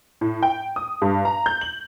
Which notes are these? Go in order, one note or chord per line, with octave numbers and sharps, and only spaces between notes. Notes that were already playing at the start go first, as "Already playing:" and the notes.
A2
G5
D#6
G2
A#5
G6
F#7